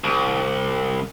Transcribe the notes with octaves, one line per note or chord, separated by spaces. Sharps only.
C2